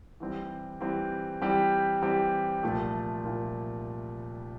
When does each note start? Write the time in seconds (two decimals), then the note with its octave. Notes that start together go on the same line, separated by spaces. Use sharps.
0.20 E3 G3 C4 G4
0.81 E3 G3 C4 G4
1.42 E3 G3 C4 G4
2.02 E3 G3 C4 G4
2.63 C2 A#2 F3 A3
3.25 A#2 F3